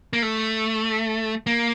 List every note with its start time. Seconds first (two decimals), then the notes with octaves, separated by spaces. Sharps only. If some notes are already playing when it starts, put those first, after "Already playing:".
0.13 A#3
0.22 A3
1.47 A#3